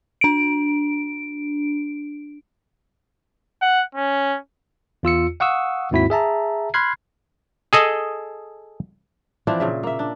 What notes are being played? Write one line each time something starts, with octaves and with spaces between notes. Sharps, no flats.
D4 D7
F#5
C#4
E2 F4 E6 C#7
F5 F#5 C#6 D#6 E6
D#2 G#2 C4 E4 F#4 B6
G#4 E5 A5 A#5
B5 C6 F6 F#6 G#6 C7
G#4 A4 D#5
E3 F3 C4 D4
A#2 C#3 E5
A#3 E5
D4